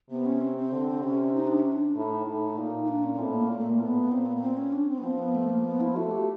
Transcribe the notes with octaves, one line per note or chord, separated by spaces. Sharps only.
C3 B3
C#4
C4
C4
D3
C3 C#4
D#4
D4
C#4
D4
A2 D#4
A2
A#2
D#4
D4
C#4
C#4
A2 C4
A#3
A#2
A3
A#3
A2 B3
A#2 C4
B3
B3
C4
C#4
D4
C4
B3
F3 C4
B3
A3
A#3
B3
E4
A3 F#4
G4